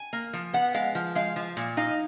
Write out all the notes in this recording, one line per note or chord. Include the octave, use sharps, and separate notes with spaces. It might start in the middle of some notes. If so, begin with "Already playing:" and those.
Already playing: G#5
A#3
F3
B3 F#5
G#3 F5
F3
G#3 F5
F3
A#2
D#4 F5